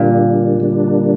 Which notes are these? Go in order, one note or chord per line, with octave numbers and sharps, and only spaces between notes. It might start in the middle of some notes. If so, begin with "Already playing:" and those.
Already playing: A#2 D3 G3 A#3 D4
D3 G3 A#3 D4